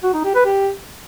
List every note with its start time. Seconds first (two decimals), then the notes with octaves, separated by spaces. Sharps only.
0.03 F#4
0.14 D#4
0.24 G4
0.35 B4
0.45 G4